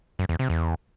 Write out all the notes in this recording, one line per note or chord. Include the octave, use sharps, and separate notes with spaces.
F#2
E2
C3
E2